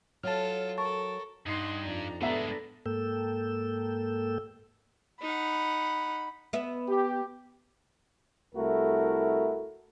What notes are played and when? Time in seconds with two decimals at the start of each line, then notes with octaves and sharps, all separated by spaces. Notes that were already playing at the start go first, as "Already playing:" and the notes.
0.23 F#3 F4 A4 A5 F6
0.78 A4 A#4 A5 C#6
1.46 G2 D#4 D#5 F#5 C6 C7
1.82 F2 D4 A#5
2.21 A2 G#3 B3 D4 A4 B4 E5 A#5
2.86 G#2 A#3 A4 G5 E6
5.21 D#4 F#5 B5
6.53 B3 E5
6.89 G4
8.55 C2 A3 E4 F#4 A#4